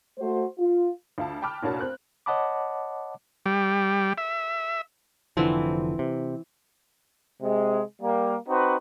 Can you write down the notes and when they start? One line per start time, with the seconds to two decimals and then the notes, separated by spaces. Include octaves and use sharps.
0.18 A3 F#4 C5
0.58 F4
1.18 D2 F4 A5
1.42 G5 A5 B5 D6 F6 F#6
1.63 F1 A#2 D4 F#4 C#5 A5
1.81 C4 F#6
2.26 C#5 D#5 F#5 A5 B5 D6
3.46 G3
4.18 E5
5.37 F1 D3 E3 F3 C4 C#6
5.99 C3
7.42 C3 G#3
8.02 G3 A#3
8.48 C4 D#4 F#4 B4 C5